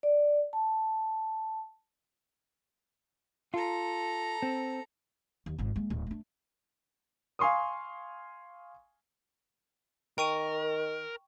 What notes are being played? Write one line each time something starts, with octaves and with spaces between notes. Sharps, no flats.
D5
A5
F4 A4 A#5
C4
D#2
G#1 F2
G#3 A#3
D1
A3 D4
F5 G#5 C6 C#6 D#6
D#3 A#4 G5 C#6 D#7